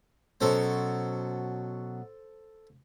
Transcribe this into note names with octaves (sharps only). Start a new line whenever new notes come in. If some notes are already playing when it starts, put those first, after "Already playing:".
B2 F#3 C#4 A4 C5